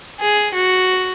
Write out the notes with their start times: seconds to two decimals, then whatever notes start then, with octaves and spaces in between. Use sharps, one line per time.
0.21 G#4
0.55 F#4